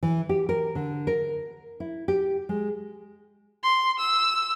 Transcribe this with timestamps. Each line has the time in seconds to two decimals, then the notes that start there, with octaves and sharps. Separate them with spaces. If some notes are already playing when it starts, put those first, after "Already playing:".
0.03 E3
0.29 G4
0.49 A#4
0.75 D3
1.07 A#4
1.80 E4
2.08 G4
2.49 G#3
3.63 C6
3.99 E6